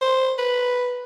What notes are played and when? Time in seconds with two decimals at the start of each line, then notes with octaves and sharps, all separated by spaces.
0.01 C5
0.38 B4